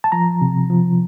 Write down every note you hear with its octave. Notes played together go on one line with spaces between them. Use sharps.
A5
F3 A#5
C3
F3